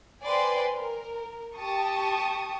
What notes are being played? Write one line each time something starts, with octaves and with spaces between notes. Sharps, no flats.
B4 C5 D5 G5 G#5 C6
A#4
G4 A5 C#6 D#6